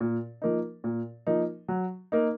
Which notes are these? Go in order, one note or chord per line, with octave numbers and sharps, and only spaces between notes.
A#2
F3 A#3 D#4
A#2
F3 A#3 D#4
F#3
A#3 D#4